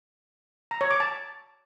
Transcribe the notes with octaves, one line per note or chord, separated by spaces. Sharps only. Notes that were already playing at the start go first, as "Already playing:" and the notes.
A#5
C#5
D6
A5